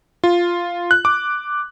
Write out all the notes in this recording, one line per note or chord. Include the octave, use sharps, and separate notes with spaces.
F4
F#6
D6